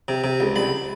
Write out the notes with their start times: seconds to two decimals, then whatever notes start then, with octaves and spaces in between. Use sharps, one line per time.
0.08 C3
0.24 C3
0.40 C#2
0.56 C2 B5